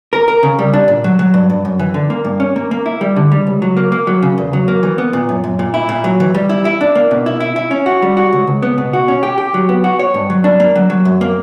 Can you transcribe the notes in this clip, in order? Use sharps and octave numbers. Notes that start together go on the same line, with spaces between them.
A#4
A#4
C#3
G3
D4
A#2
F#3
F#3
G2
G2
F#2
E3
D3
A#3
G2
C#4
A#3
A#3
E4
G3
D3
G3
C#2
F#3
A#3
A#3
F#3
C#3
E2
F#3
A#3
E3
B3
A#2
F#2
F#2
A#2
E4
A#2
F#3
E3
G3
E4
E4
D4
A#3
B2
E4
E4
E4
C#4
F#4
G3
F#4
C#2
C#2
B3
B2
F#4
C#4
G4
G4
F#3
B3
F#4
C#5
G2
F#3
D4
A#3
F#3
F#3
F#2
A#3